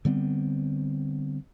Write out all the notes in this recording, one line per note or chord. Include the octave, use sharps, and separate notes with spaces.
D3 G3 B3 C4